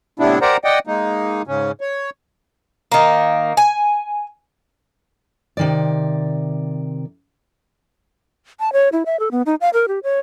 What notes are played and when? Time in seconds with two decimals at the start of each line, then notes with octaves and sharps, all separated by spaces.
0.19 A2 C3 G3 B3 D4 E4
0.42 G4 A#4 C5 D5 F#5 A#5
0.64 D5 D#5 F#5 G5
0.87 G#3 A#3 D#4
1.47 G#2 C#3 C#4
1.81 C#5
2.92 D#3 A#3
3.57 G#5
5.57 C3 D#3 D5
8.60 A5
8.73 C#5
8.92 E4
9.06 E5
9.20 A4
9.31 B3
9.46 D#4
9.61 F5
9.74 A#4
9.88 G4
10.03 C#5